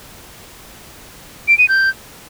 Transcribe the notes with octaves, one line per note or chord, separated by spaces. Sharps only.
D7
D#7
G6